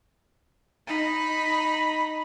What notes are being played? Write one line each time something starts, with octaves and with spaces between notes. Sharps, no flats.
D#4 B5